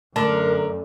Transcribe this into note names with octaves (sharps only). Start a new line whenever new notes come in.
F#2 D3 A3 A#4 A5